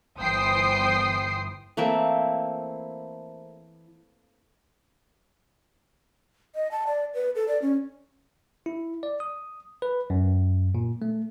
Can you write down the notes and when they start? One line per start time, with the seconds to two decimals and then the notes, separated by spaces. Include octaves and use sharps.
0.18 G1 E3 C5 G5 D#6 C7
1.77 E3 A3 A#3 C4
6.55 D#5
6.71 A5
6.87 D5
7.14 B4
7.36 A4
7.48 D5
7.62 C#4
8.66 E4
9.03 D5
9.20 D#6
9.82 B4
10.10 F#2
10.75 A#2
11.02 A3